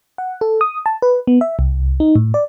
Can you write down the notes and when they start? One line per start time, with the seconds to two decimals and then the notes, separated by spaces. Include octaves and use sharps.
0.18 F#5
0.41 A4
0.61 D#6
0.86 A5
1.02 B4
1.27 B3
1.41 E5
1.59 C2
2.00 D#4
2.16 A2
2.34 D5